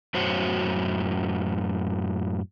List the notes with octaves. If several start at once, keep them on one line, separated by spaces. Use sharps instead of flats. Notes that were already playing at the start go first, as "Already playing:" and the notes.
F#2 A2 F#4 C5 C#5